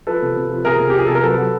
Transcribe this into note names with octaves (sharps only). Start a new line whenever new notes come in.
F3 A4 B4
C3
C3
F3
C3 G#4 A#4
C3
G4
F3 G#4
C3 A4
A#4
F#3 A4 B4
F#3